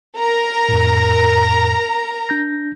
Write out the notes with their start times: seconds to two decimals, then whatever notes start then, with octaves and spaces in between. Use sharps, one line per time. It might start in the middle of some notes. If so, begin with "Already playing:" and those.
0.18 A#4 A#5
0.69 F2 A2
2.29 D4 G6 A#6